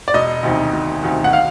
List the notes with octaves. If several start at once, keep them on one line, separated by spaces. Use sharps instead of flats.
D5
E1 D#5
D2 C3 D#3
E1
D2 C3 D#3
F#5
F5